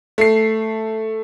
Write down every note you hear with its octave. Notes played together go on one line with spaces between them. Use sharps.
A3 C7